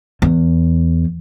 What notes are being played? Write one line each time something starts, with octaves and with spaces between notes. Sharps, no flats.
E2